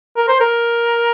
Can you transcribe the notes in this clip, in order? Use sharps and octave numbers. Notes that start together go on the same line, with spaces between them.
A#4
C5
A#4